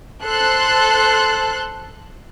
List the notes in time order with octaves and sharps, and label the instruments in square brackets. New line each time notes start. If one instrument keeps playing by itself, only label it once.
[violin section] A4 C5 C6 F#6